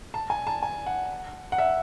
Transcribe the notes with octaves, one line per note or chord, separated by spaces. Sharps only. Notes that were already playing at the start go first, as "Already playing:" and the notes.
A5
G#5
A5
G#5
F#5
F#5
E5